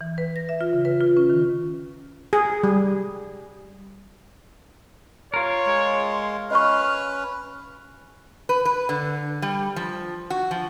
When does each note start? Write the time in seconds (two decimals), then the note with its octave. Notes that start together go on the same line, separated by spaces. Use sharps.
0.01 E3
0.18 B4
0.36 A#6
0.49 E5
0.61 F4
0.73 C#3
0.85 B4
1.01 F4
1.17 C#4
1.30 D#3
2.33 G#4
2.63 G3
5.34 F4 A#4 C#5
5.66 G#3
6.51 C#4 B4 D#5 C#6 F6
8.49 B4
8.65 B4
8.89 D3
9.42 G3
9.76 F3
10.30 F#4
10.51 F3